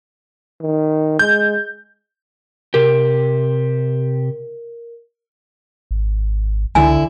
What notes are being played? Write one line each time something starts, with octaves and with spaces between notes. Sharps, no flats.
D#3
G#3 G6
C3 G4 A#4
G#1
C#2 D3 E4 G#5